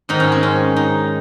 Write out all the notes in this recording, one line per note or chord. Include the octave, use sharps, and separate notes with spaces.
G#2 D#3 D#4
C#4
C4
C#4
D#4